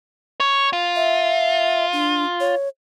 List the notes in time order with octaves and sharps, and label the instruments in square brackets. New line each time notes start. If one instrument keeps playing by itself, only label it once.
[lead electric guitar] C#5
F4
[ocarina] E5
D4
C#5